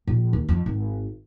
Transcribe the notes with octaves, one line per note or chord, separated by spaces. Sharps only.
A#1
D#2
F2
G#1